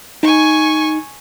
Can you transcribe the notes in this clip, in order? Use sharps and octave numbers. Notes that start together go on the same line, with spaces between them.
D#4 G#5 C#6